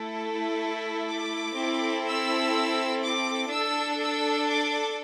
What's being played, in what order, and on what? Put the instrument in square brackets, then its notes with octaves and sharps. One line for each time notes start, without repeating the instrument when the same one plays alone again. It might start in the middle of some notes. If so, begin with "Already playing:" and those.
Already playing: [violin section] A3 E4 A4
A5
D6
C4 E4 A4
E6
D6
D4 A4 E6
E6
D6